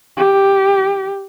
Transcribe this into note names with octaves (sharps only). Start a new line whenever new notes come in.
G4